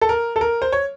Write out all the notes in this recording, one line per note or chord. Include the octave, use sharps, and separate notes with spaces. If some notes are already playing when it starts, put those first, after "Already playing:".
A4
A#4
A4
A#4
C5
C#5